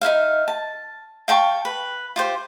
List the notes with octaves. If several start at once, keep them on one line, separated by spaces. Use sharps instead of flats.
D#4 E4 E5 F5
A5
F5 G5 A5 C#6
B4
F4 G4 C5